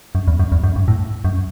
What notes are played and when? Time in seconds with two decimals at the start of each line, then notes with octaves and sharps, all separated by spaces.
0.15 F#2
0.28 E2
0.39 F#2
0.52 E2
0.64 F#2
0.76 G2
0.88 A2
1.25 F#2